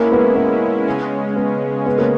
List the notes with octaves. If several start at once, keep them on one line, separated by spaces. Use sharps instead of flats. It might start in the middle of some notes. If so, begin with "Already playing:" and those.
Already playing: G#3 A#3 C#4 E4
B3
B3
C#3 G#3 C#4
B3
B3
A#3